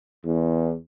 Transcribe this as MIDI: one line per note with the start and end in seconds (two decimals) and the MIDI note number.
0.25 0.74 40